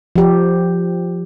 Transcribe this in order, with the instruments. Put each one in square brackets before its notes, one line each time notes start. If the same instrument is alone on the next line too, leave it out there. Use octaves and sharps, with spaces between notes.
[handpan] F3 G4